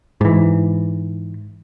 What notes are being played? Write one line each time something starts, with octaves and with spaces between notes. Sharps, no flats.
G#2 E3